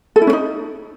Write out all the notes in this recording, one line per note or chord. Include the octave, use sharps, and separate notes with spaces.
A4
E4
C#4
D#4